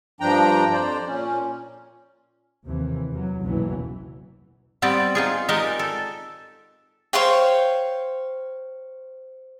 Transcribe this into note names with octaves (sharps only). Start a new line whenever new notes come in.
G2 F3 D4 G5 A#5
F2 C5 D5
A#2 C#4
D#2 C3 E3
E2 F#3
F#1 B1 E2 B2 E3 F#3
G3 B3 C4 D5
D#4 F4 G#4
G#3 D#4 G4 A#4 D5 D#5
A4
C5 C#5 F5 G5